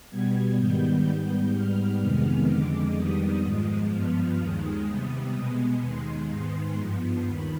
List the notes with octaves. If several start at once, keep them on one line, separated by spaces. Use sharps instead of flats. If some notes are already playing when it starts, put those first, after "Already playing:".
B2 G3 B3 G#6
G#2 D#3 G3 B3 G6
G#2 G3 B3
G#2 G3 B3 F6
F2 C3 D#3 G#3 B3
F2 D3 G#3 D6
F2 D#3 G3 B3 D#6
G#2 F3 G#3
G2 F3 B3 F6
D#2 D#3 G#3 D#6
C3 G3 B3
B2 G#3 B3
D#2 D#3 G#3 C6
G#2 D#3 G#3 B3
G2 F3 B3
D#2 D#3 B5